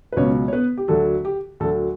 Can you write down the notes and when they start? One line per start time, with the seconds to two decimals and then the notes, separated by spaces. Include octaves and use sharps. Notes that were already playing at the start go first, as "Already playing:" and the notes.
0.12 B4
0.17 C#2 B2 F#3 C#4 C#5
0.48 C#5
0.53 B3 B4
0.78 G4
0.88 D2 D3 F#3 A4
1.25 G4
1.60 D2 D3 F#3 A4